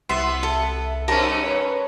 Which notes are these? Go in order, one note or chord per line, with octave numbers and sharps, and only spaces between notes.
C2 B3 E5 C6
A4
G2 C#4 A#4 A5
B4 C#5